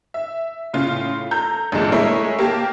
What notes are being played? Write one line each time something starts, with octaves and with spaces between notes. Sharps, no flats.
E5
A2 C#3 F4
A4 A#5 G6
A1 A#2 D3 G#3 A5
G#3 A3 E4 A#4 C#5
A#3 G4 A5